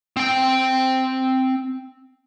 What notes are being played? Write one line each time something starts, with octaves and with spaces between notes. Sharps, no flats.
C4 G5